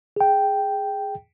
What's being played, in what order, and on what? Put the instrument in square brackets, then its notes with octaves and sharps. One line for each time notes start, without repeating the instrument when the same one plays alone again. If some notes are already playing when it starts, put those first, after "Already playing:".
[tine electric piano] G#4 G5